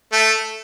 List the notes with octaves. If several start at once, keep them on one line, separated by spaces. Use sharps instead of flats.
A3